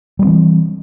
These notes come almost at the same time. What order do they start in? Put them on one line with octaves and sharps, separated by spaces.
G3 G#3 C4 E3